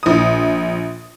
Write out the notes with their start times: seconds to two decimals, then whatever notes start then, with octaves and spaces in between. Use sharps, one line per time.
0.03 A#1 D#6